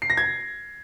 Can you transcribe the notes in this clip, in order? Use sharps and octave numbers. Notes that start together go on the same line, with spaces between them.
C7
A#6
G#6